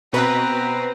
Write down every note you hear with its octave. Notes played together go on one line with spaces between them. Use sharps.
B2 C4 B4 A#5